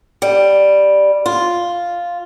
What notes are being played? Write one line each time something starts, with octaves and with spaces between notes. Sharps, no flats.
G3
F4